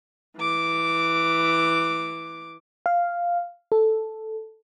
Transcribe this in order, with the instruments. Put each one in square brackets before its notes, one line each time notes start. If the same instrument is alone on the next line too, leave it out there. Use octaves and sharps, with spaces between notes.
[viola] E3 D6
[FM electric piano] F5
A4